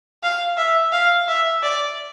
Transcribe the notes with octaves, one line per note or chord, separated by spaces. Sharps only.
F5
E5
F5
E5
D5